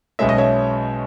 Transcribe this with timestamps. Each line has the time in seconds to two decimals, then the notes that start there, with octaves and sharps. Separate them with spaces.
0.19 B1 B2 G#3 C#4 E5
0.29 D#5
0.38 C#5 E5